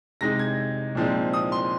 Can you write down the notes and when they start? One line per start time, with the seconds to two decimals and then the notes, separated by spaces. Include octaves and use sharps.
0.21 C3 G#3 D#4 A#6
0.39 G#6
0.95 A#2 F3 G#3 C4 D#4
1.33 D#6
1.52 C6